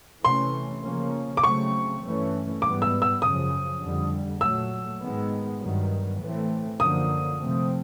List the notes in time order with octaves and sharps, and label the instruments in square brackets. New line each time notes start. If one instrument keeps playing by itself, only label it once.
[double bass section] C3 E3 A3 C#4 [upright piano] C6
[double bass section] C#3 F3 A#3 C#4
[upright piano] D6
[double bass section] C#3 F#3 A3 C4 [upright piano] C#6
[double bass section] G2 E3 A3 C#4
[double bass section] G#2 E3 G3 B3 [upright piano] D6
[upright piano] E6
E6
[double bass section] F#2 C#3 F3 [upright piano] D#6
[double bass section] F2 D3 G3
[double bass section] A#2 F#3 A3 [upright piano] E6
[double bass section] G#2 D#3 G#3 B3
G2 D#3 F#3 B3
A2 E3 A3 C4
[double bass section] F#2 D3 F3 A#3 [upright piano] D#6
[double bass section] C3 F3 A3 C4